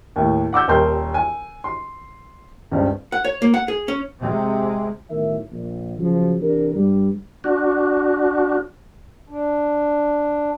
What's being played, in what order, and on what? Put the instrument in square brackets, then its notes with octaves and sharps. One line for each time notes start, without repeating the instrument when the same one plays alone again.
[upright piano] D#2 A2
F#5 D6 E6 G6
D#1 D#2 A#4 C6 G6
G#5
C6
C#2 G2 C#3 C4
[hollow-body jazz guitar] F#5
C#5
A#3
F#5
G#4
C#4
[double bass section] C3 G#3
[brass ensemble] B1 A2 D#3 A#4 E5
A#1
C#3 F3 F#3
C3 E3 D4 G4 A#4
G2 G3
[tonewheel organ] D4 F#4
[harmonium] D4